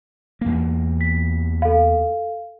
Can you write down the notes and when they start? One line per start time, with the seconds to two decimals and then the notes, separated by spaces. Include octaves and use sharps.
0.41 E2 A#3
1.01 B6
1.62 A4 F5